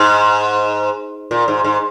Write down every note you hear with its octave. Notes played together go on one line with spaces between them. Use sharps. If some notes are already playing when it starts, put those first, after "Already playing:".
Already playing: G#2
A#2
G#2
G#2